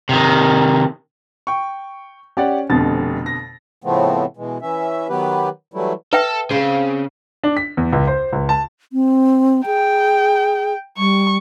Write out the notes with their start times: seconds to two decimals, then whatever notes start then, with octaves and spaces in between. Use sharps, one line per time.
0.09 C3 D#3
1.47 G5 C#6
2.37 C#4 G4 D5 F#5
2.69 F1 F2 B2 D3 A6
3.26 A#6
3.84 A2 C#3 F3 A3 B3 C4
4.37 B2 E3 G#3
4.61 E3 C#4 E5
5.09 D#3 F#3 B3 G4 B4
5.74 E3 F#3 G3 A3 E4
6.13 A4 B4 E5 G5
6.50 C#3 C4 G#4 F5
7.43 D4
7.57 B6
7.77 E2
7.92 C#2
8.07 C5
8.32 C#2
8.49 A5
8.93 C4
9.66 G#4 G5
10.97 G3 C#6